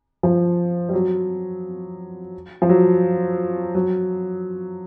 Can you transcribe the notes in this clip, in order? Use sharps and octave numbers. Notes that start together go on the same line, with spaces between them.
F3
G3
F#3
F3
F#3
F#3